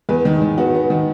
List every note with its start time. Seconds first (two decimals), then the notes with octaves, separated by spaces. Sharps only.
0.09 E2 B4
0.25 D#3
0.42 D#3
0.57 B3 F#4
0.74 B3
0.90 D#3